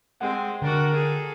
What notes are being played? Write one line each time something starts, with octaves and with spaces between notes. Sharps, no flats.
G#3 C4 F#5 G5
D3 D4 F#4 A#4
G#4 A4